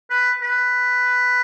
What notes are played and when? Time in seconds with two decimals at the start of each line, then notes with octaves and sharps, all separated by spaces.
0.10 B4
0.42 B4